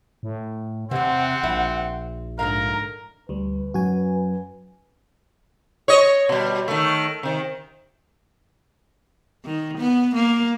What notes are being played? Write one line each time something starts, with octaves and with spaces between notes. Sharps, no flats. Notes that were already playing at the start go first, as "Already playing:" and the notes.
A2
E2 C3 E3 C4 F#5
A#1 E4
G#2 D3 A#4 F5 A#5
D2 G3 B4
F#2 F#4 G#5
C#5 D#5
B2 G3
D#3 A3
C3 D#3
D#3
B3
A#3